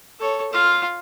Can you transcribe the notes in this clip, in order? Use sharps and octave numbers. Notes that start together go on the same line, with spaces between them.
A4 C#5
F4 F5